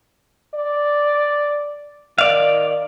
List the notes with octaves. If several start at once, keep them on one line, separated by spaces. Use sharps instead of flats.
D5
D#3 D5 F5